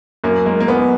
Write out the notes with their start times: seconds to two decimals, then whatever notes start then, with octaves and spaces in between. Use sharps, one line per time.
0.24 F#2 A#3
0.46 G#3 A#3
0.60 A#3
0.68 F#2 B3